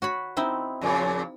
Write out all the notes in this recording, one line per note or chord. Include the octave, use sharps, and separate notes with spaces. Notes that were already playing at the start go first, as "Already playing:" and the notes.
F#4 C#5 B5
C4 D#4 E4
F2 A#2 C#3